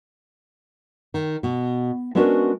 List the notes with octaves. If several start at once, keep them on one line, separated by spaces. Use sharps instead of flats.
D#3
B2
G#3 B3 C#4 D4 F#4 A#4